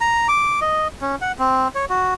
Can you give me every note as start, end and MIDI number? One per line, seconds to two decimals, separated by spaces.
0.01 0.27 82
0.28 0.60 86
0.61 0.88 75
1.01 1.16 61
1.21 1.32 78
1.39 1.68 60
1.75 1.85 73
1.90 2.14 66